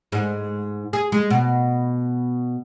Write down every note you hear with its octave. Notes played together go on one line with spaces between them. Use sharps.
G#2
G#4
G#3
B2